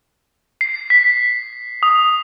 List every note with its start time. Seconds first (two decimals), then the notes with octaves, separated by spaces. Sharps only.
0.61 C7
0.90 B6
1.83 D#6